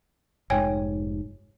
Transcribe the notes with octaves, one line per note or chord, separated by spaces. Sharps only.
F1 G#2 C#5 G5 G#5